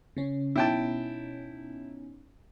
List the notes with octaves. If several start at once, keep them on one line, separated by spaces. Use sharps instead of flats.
C#3 C#4
B2 C#4 D#4 E4 G5 A5